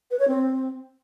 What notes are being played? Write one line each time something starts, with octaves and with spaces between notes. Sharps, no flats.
B4
C#5
C4